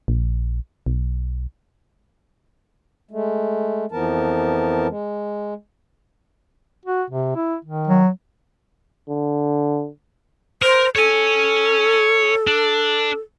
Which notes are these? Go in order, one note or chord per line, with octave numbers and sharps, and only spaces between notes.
A#1
B1
G#3 A3
F2 E3 F3 B3 A#4 A5
G#3
F#4
C3
E4
D#3
F#3
D3
A#4 C5
A4 C#5 G#5
D4